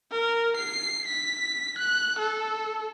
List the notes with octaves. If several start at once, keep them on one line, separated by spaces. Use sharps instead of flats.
A#4
C7
B6
F#6
A4